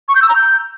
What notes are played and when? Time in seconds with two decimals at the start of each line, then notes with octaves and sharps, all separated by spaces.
0.09 C#6
0.15 G6
0.22 E6
0.29 A#5
0.36 G6